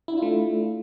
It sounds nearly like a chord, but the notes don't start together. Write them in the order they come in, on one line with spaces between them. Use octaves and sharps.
E4 D4 F4 A3